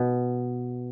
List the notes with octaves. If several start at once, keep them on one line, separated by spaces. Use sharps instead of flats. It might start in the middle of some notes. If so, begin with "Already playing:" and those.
Already playing: B2